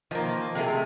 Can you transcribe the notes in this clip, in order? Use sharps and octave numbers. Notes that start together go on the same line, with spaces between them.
D#3 F3 A#3
C3 A3 G#4 A#4